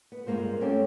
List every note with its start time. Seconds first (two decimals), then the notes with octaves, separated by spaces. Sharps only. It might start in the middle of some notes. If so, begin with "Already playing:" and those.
0.12 B3
0.26 G2 G#3 A#3 F4 C5
0.60 A3 A#3 C4 C#4 G4